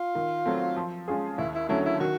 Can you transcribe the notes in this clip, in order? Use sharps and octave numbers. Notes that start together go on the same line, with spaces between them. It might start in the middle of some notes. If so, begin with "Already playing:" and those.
Already playing: F4
D#3
F#3 A3 C4
F3
G#3 C#4 F4 G#4
D#2 E4
E4
D3 F#3 A3 C#4 E4
E4
D#3 F#4